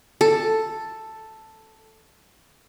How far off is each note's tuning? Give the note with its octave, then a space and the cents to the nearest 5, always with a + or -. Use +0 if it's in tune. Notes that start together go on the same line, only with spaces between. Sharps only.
A4 +5